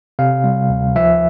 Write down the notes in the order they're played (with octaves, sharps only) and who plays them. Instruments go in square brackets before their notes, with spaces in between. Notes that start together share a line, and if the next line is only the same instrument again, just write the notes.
[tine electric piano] C3 F5
G3
D2
F3 E5